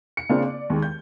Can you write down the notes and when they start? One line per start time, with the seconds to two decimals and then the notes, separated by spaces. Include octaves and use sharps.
0.17 C#7
0.29 C#3 A#3 C4 D4 F4
0.43 D5
0.70 D#2 G#3
0.82 G6